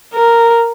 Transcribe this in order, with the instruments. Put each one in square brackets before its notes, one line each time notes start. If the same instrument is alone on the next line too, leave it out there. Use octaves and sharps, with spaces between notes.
[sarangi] A#4